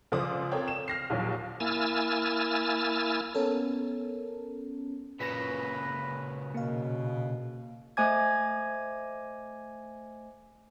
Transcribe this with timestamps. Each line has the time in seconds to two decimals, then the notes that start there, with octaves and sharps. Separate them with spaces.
0.12 C#2 F3 C5 D5 D6 D#6
0.52 C4 A4 A#4 C#5 D5 G5
0.68 E7
0.88 F6 A#6 C7
1.10 A#1 D#2 A#2 F3 F#3
1.60 A#3 E4 G#5 E6 F6 A6
3.34 B3 C#4 A4 A#4
5.20 A#2 C#3 B4 A#6 B6
6.54 B2 A#3 F5
7.97 A3 C5 D#5 G#5 D6 G#6